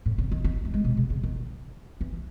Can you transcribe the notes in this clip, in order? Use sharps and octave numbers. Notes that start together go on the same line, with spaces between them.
A2
C#3
D#3
D#3
A3
G#3
B2
C#3
C#3
D#3
E3